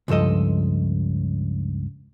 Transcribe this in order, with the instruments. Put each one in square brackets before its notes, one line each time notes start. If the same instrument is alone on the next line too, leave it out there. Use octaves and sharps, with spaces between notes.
[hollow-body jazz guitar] C#2 G2 F3 A4 D#5